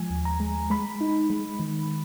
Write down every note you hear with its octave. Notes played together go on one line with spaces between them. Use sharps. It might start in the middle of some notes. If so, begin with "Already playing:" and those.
Already playing: F3 G#3 G#5
D#2
A#5
G#3
G#3 B5
D#4
G#3
D#3